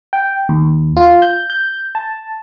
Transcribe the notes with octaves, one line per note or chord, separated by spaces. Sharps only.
G5
D#2
F4
G6
G6
A5